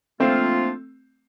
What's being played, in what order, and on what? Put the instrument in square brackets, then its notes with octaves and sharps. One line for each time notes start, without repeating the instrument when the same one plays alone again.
[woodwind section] F3 A#3 D4 F4 [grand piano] A3 C4